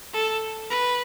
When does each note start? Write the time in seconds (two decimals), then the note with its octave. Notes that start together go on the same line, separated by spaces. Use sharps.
0.14 A4
0.70 B4